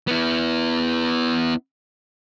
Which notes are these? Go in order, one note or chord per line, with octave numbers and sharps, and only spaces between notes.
B3 E4